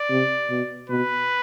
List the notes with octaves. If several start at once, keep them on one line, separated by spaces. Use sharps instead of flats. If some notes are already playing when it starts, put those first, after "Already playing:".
Already playing: D5
C3
B2
B2 B4